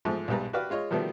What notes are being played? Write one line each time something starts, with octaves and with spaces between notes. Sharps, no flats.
G#2 F3 A3
B1 G#2 G3 B4 A#5
F#4 G4 B4 D5 F5
G#3 F4 C#5 D#5
B2 D#3 F3 G3 A3 B3